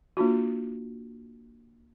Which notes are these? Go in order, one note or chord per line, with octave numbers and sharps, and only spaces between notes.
A#3 D4 F4 F#4